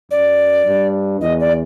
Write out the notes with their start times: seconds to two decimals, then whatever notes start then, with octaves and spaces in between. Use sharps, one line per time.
0.11 F#2 D5
0.66 G2
1.21 E2 D#5
1.40 D5